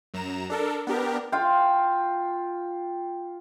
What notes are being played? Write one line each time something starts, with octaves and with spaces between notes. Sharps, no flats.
F#2 A#5 E7
D4 A4 A#4
B3 D4 G4 A#4
F4 F5 G5